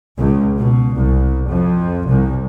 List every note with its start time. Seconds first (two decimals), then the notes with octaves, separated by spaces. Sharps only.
0.17 C#2
0.57 B2
0.95 C2
1.48 F2
2.06 C2